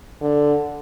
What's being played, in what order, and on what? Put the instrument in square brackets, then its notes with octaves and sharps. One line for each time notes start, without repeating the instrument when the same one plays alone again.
[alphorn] D3